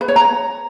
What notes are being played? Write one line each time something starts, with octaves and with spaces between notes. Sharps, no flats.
B4
C#5
A#5